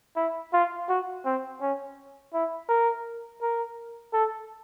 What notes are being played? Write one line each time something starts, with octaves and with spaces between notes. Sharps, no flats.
E4
F4
F#4
C4
C#4
E4
A#4
A#4
A4